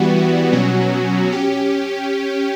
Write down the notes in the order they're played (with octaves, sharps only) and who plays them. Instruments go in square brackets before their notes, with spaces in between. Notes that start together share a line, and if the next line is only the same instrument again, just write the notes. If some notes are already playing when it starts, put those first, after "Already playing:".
Already playing: [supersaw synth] E3 G3 B3 F#4
B2 F#3 C#4 F#4
C#4 G4